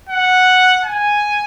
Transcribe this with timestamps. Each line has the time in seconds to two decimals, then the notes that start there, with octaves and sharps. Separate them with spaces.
0.09 F#5
0.85 G#5